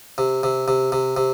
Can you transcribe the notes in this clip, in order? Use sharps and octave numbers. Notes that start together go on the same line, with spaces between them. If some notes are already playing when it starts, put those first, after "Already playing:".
C3
C3
C3
C3
C3